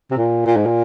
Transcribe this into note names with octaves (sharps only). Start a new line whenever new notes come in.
C3
A#2
A#2
G#2
A#2